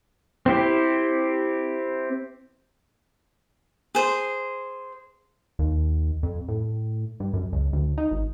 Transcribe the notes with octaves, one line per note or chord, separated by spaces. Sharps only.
C4 E4 G4
G#4 C5
D#2
F2
A2
G2
F#2
C#2
D2
D#4
G#1